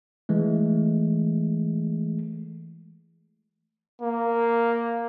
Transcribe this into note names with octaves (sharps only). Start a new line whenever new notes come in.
E3 G#3 A3
A#3